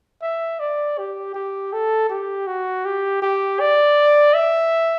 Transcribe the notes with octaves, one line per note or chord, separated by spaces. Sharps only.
E5
D5
G4
G4
A4
G4
F#4
G4
G4
D5
E5